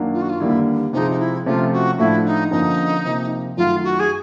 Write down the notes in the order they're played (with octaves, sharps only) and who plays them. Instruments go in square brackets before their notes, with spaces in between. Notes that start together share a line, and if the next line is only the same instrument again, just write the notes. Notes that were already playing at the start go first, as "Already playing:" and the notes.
Already playing: [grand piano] F#2 D#3 F#3 A#3 D4
[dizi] F4
F#4
F4
[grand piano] D#2 D3 G3 A#3 [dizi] E4
[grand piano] C3 F3 G#3 [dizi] D#4
[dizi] D#4
E4
[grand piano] C3 F3 A3 C#4 [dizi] F4
[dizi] F#4
[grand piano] A2 F3 A3 D4 F#4 [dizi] E4
[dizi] D#4
[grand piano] F2 D3 F3 A#3 C#4 [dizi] D#4
[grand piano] C3 F3 A#3
[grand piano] F#2 D#3 F#3 A3 [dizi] F4
[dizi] F#4
G#4